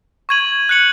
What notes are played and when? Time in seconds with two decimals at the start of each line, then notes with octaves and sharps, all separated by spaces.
0.29 C#6 G#6 D#7 F#7
0.69 F#6 C#7 F#7